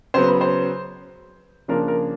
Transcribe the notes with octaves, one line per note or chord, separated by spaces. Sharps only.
C#3 F#3 B3 C5
B4
C5
C#3 F3 A#3 D4 A#4
A#4